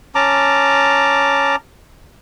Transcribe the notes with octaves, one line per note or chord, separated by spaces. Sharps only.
C#4 A5 A#5 D6